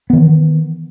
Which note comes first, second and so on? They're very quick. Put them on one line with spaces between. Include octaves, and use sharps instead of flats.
B3 D#3 E3